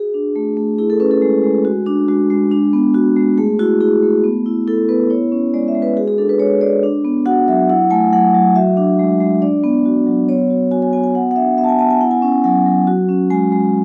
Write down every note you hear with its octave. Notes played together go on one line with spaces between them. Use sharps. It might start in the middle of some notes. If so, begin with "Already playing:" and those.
Already playing: F#4 G#4
D4
A3
A3
E4 G#4
A4
C#4 B4
A4
G#3
G#3
F#4
D4
G#3 F#4
G#3
D4
B3
F#4
G#3
A3 G#4
E4 F#4
E4 G#4
A3
B3
E4
E4 A4
B3 B4
E4 C#5
C#4
G#3 D5
E5
G#3
B4
F#4 G#4
G#4
D4 A4
B4
G#3 C#5
G#3 D5
D4
B3
F#4 F#5
F#3 E5
E4 F#5
A3 G#5
F#3 F#5
F#3
F#4 E5
D4
G#3
G#3
D4 D5
B3
F#4
F#3
B3 C#5
F#4
F#4 G#5
G#5
B3 G#5
G#5
F#4 F#5
F#5
D4 E5
B3 E5
A5
G#5
B3 A5
G#5
E4 F#5
G#5
C#4
F#3 F#5
F#3
F#4
C#4
G#3 G#5
G#3